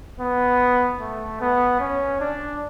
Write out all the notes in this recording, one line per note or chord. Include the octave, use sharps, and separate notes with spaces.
B3
A3
B3
C#4
D4